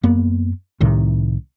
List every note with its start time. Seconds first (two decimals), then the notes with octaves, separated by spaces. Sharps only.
0.03 F#2 A#3 B3
0.80 C2 A2 C3 D#3